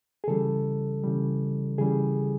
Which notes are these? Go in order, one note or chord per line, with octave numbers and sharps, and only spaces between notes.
G#4
C#3 E3 G3 A4
C#3 E3 G3
C#3 E3 G3 G#4